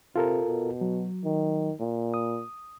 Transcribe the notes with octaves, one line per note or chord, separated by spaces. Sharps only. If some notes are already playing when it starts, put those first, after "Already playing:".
C3 F4 A4 A#4
B2
F#3
D#3
A#2
D#6